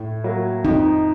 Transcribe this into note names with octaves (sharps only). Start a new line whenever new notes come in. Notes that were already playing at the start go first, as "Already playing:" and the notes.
Already playing: A2
F#3 A#3
F2 D#4